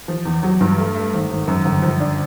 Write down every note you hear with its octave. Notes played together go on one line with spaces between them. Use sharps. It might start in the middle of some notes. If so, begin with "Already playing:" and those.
F3
E2
F#3
G2
A3
A3
G#1
G#1
F#2
G1
F3
D4